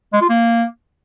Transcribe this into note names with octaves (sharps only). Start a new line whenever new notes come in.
G#3
F4
A#3